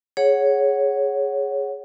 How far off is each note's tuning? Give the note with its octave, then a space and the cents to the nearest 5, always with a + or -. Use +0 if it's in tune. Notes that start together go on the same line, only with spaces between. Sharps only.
G#4 +0 C#5 +0 F#5 +0